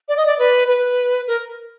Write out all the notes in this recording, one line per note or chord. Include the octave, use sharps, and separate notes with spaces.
D5
D#5
D5
B4
B4
A#4